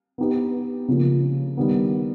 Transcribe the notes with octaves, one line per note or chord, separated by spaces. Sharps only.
B3 D#4 G4 B4
C#3 F3 A#3
D#3 G3 B3